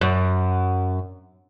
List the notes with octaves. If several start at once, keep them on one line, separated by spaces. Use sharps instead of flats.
F#2